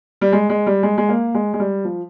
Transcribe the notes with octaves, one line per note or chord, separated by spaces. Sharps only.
G3
G#3
G#3
G3
G#3
G#3
A#3
G#3
G#3
G3
F3